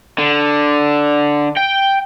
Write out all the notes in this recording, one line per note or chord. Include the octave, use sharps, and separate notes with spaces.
D3
G5